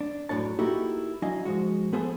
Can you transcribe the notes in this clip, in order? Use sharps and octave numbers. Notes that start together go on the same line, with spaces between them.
D4
F#2 A2 D4 C#5 A5
A#3 D#4 E4 F#4 G4 A4
F#3 D4 E4 D#5 F5 G#5
G#2 F3 G#3 F#4
F3 B3 G#4 A4 C5 E5